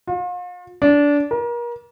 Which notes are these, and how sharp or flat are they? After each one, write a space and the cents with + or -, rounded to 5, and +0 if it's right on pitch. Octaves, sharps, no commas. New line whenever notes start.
F4 +40
D4 -20
A#4 +35